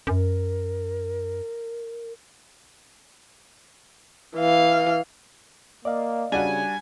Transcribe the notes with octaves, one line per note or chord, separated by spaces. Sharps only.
F#2 A#4
E3 F5
A#3 D5 D#5 F5
C#3 G3 D4 F#4 G#5